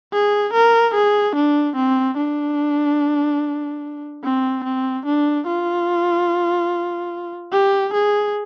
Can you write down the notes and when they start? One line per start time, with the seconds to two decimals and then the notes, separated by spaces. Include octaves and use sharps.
0.13 G#4
0.53 A#4
0.94 G#4
1.36 D4
1.76 C4
2.17 D4
4.23 C4
4.64 C4
5.05 D4
5.46 F4
7.53 G4
7.93 G#4